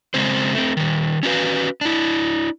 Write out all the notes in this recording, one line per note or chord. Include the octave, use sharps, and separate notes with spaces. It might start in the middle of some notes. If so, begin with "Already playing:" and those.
C#3 G#3 C4 C5
A3 C4
D#3 G3
C#4 D4 F#4 B4 F5
D4 E4